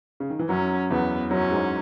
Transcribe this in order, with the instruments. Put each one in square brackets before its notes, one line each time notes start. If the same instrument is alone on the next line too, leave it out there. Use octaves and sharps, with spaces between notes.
[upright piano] C#3
D#3
E3
[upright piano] F#2 F#3 [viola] C#4
[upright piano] E2 E3 [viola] B3
[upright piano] F#2 F#3 [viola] C#4
[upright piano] G#2 G#3